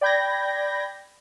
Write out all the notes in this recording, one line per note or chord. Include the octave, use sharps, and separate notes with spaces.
D5 G5 B5 G6 G#6 A#6